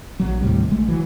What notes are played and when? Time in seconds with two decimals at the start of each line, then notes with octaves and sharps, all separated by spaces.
0.20 A#1 F#3
0.40 D#2 A2 C3 G3
0.71 A#1 G#3 A3
0.88 E3 F#3